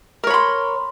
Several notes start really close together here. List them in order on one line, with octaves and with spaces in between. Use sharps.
A#4 C#5 B5 C6